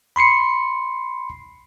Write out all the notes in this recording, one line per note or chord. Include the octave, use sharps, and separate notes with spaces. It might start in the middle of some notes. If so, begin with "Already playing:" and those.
B5 C6 C7 C#7